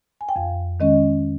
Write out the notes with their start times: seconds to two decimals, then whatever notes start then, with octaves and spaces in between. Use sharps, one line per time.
0.21 G#5
0.29 G5
0.36 F2 F5
0.80 D#3 G#3 C#4 D#5